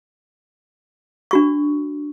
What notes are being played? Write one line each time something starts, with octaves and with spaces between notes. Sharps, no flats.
D4 F#4 C#6